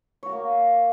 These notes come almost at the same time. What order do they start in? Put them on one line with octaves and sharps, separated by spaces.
C#5 F#4 A#4 A#3